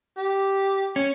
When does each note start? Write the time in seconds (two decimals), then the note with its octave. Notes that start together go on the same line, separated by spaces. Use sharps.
0.17 G4
0.96 C#4